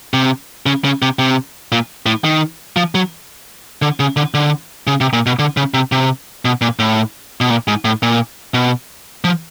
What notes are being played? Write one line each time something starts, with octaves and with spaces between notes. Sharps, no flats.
C3
C#3
C#3
C3
C3
A#2
A2
D#3
F3
F#3
D3
C#3
D3
D3
C#3
C3
A#2
B2
D3
C#3
C3
C3
B2
A#2
A2
B2
A#2
G#2
A2
A#2
B2
F3